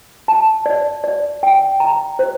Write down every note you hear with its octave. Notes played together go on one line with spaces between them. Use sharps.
A5
D5
D5
G5
A#5
C5